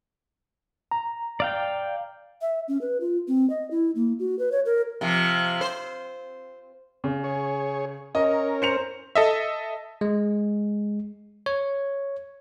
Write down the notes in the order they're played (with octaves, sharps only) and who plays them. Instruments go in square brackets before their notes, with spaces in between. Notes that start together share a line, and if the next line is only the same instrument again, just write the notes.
[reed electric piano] A#5
[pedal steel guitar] D5 F5 G5
[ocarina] E5
C#4
B4
F4
C4
D#5
E4
A#3
F#4
B4
C#5
A#4
[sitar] C3 F3
C5
[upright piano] C#3
[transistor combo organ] G#4 C#5
[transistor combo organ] C#4 A#4 [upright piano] D#5
[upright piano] C5 C#7 F7
[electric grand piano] A4 D#5 E5
[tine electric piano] G#3
C#5